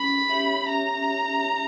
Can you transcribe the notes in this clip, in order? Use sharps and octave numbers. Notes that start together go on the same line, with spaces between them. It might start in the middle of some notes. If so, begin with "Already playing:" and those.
Already playing: C#4 B5
G4 C#5 E5
C#4 A#5